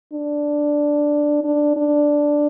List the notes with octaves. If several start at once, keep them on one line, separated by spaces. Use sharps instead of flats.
D4
D4
D4